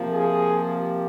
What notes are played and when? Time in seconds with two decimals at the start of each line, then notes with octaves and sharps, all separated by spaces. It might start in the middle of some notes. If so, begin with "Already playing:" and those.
Already playing: C3 F3 A#3
0.10 G#4
0.76 G4